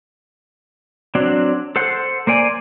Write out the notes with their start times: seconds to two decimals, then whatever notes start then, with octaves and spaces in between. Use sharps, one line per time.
1.15 F#3 C4 D4
1.76 A4 C5 F#5
2.27 A#3 C5 D5 G#5